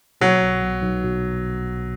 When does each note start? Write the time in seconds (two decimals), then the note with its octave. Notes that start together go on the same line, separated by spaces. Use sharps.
0.21 B2 F#3
0.41 B1
0.62 B1
0.83 B1
1.03 B2